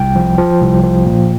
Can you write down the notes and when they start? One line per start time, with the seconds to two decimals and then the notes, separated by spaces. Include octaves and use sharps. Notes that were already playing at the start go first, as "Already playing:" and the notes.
Already playing: C2 G5
0.16 F3
0.38 F3
0.61 C2
0.83 F3
1.06 A#2